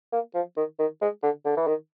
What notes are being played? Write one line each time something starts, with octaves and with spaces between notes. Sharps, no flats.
A#3
F3
D#3
D#3
G#3
D3
D3
E3
D#3